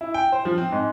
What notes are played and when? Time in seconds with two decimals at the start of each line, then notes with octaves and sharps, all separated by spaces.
0.01 E4
0.14 G5
0.32 C5
0.45 F3
0.58 C4
0.72 G#2